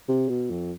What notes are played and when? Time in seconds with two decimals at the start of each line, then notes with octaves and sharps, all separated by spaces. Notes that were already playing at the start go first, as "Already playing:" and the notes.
0.08 C3
0.29 B2
0.50 F2